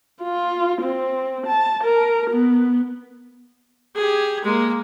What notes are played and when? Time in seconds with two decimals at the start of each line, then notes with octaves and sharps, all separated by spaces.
0.22 F4
0.82 C4
1.46 A5
1.83 A#4
2.30 B3
3.95 G4 G#4
4.44 G#3 A#3